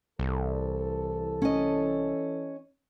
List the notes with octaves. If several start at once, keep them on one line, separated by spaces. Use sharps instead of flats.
C2 E3 A4
C#4 D#5